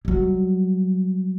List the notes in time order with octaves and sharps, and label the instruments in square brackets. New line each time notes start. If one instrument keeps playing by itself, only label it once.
[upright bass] F#3 G3